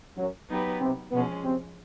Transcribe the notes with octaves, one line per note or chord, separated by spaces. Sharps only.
F#2 F#3
F#3 B3 D#4 G4 B4
C3 C4
B2 F3 G#3 B3 C#4
C3 C4